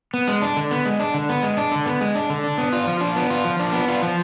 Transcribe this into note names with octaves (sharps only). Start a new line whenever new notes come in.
B3
G#3
D4
D3
B3
G#3
D4
D3
B3
G#3
D4
D3
B3
G#3
D4
D3
D4
B3
F4
F3
D4
B3
F4
F3
D4
B3
F4
F3